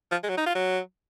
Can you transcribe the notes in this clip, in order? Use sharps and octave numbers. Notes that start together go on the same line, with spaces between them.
F3
G#3
F#3
D#4
F4
F#3